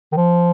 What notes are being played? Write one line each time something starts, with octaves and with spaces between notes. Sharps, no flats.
D#3
F3